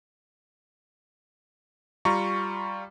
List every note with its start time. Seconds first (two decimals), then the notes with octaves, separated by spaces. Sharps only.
2.05 G3 F4 A#5 C#6